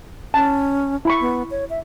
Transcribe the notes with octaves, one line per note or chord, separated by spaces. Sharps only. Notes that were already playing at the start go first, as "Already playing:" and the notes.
C#4 A5
E4 B5 C#6
B3
C#5
E5